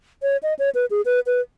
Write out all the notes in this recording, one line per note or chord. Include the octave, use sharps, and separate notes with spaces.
C#5
D#5
C#5
B4
G#4
B4
B4